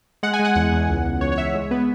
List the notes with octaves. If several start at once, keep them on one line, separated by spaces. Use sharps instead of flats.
G#3 F#5
G#5
G#3
F#5
E2 F#5
E2
C#2
C#2
C#2 C#5
C#5
C#2 E5
G#3
B3 B4